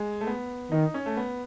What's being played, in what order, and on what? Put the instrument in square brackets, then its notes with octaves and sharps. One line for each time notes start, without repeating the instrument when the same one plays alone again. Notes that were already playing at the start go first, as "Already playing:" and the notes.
Already playing: [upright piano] G#3
A3
B3
[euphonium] D#3 [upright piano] D#4
[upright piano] C#4
A3
B3